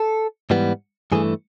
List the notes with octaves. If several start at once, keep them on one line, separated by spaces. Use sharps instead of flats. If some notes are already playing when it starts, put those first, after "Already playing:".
Already playing: A4
G#2 E3 G3 B3
G2 E3 A3 G#4